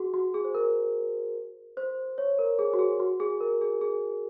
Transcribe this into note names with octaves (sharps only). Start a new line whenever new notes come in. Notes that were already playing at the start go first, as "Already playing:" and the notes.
Already playing: F#4 G#4
F#4
G#4
C5
A#4
C5
C#5
A#4
G#4
F#4
G#4
F#4
G#4
A#4
G#4
G#4